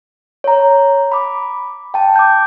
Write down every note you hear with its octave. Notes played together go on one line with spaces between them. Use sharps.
C#5 A#5
B5 D6
G5 A5
D6 G6